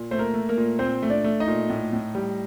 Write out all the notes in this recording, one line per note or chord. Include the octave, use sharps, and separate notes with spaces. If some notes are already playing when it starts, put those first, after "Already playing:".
Already playing: A#2
A3 C5
A#3 A#4
A3
A#3 A#4
A#2
A#2 C4 C5
A3
D4 D5
A3
D#4 D#5
A#2
A2
A2
G3